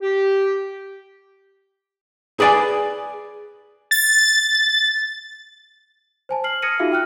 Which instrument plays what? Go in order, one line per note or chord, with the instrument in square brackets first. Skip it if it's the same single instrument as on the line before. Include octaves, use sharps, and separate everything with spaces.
[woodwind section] G4
[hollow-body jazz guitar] G#4 B4 D5 G5 G#5
[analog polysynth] A6
[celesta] C5 G#5 A5
F6 C7 F#7
D#6 F6 G#6 A#6 C#7 D#7
D#4 F4 F#4 G#4 E5 F5
G5 F6 F#6